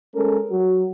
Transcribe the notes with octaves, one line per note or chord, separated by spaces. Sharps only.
G#3 C#4 A4 A#4
F#3 F#4